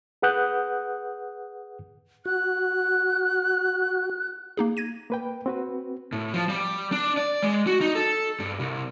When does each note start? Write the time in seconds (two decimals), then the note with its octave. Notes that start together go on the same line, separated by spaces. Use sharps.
0.22 G#4 B4 F#5 D#6 F#6 G6
2.25 F#4 F#6
4.57 A#3 D#4 G#4
4.77 G#6 A#6 D#7
5.10 A#3 B4 G5
5.46 C4 F#4 B4
6.12 A2
6.34 F3
6.49 G3
6.92 D4
7.17 D5
7.43 G#3
7.67 F#4
7.81 D#4
7.95 A4
8.40 G2
8.60 C2